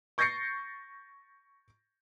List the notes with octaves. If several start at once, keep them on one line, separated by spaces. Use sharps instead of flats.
C#6 G6 A6 A#6 C7 C#7